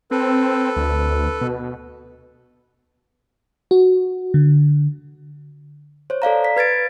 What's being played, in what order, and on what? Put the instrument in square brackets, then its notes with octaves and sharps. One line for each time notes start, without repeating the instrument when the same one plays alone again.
[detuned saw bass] C4 [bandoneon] A4 B4
[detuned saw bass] D2
B2
[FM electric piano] F#4
D3
[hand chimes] C5 C#5
A4 D5 F5 A#5
B6
B4 G#6 A6 D7